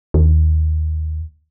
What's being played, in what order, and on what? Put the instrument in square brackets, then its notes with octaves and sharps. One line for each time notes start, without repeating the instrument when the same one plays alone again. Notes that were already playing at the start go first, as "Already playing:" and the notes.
[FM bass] D#2